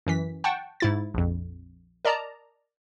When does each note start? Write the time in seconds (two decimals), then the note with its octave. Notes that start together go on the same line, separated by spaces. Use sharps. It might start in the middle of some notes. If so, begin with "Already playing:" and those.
0.07 F#2 E3 B6
0.44 F#5 G5 A5 C#6
0.80 G#2 E4 A6
1.14 A#1 F2
2.05 A#4 D5 D#5 A5 A#5